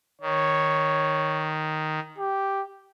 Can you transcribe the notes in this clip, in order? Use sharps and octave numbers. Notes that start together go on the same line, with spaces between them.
D#3 C#5
G4